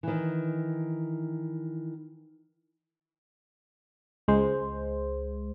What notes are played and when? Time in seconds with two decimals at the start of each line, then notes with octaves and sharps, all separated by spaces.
0.03 D#3 E3
4.28 C#2 G#3 C5